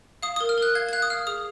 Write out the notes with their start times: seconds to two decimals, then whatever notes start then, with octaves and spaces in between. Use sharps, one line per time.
0.23 F5 D#6
0.36 D#6
0.40 A#4
0.49 F6
0.58 A#4 F#6
0.75 F5 G#6
0.89 G#6
0.93 F5 F#6
1.02 D#6
1.10 F5 F6
1.27 G#4 D#6